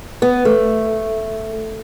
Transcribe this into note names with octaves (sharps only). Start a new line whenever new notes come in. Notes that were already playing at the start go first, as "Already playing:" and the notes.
B3
A3